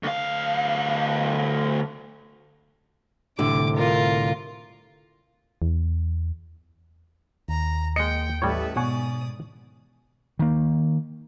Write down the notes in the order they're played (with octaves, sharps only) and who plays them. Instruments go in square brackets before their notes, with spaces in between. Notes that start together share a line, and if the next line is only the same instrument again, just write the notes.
[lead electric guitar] D2 F5
[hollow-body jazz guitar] C2 A2 D3 [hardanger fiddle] D6
[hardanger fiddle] F4 A#4
[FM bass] E2
[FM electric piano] D#2 [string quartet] A#5
[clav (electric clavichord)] G#3 D#5 [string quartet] A#3 G5 [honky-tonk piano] C#7
[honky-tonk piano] A1 D#6 [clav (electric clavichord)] G3 C#5 [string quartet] A4 B4 E5
[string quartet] G#2 D5 D#6 [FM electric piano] B2 [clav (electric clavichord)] C#5 F#5 [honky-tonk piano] G#5 C#6
[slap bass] D#3 A#3